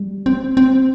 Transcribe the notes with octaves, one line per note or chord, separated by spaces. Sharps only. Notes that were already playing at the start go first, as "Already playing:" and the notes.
Already playing: G3
C4
C4